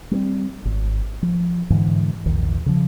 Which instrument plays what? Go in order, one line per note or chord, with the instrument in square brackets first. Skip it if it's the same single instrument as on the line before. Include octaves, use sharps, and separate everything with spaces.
[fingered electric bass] G3 A#3 C4
G#1
F3
G#2 D3 E3 G#3
A#1 E2 D#3
C#3 F3